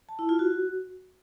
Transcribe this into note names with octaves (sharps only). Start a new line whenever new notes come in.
A5
E4
F4
F#4